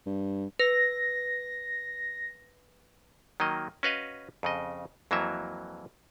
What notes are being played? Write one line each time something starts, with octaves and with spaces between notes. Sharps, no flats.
G2
B4 A#6
D#3 F#3 A#3 D#5
C#4 F#4 B4 D#5 F5
F2 C#3 D#5
F2 E3 F#3 A#3 E5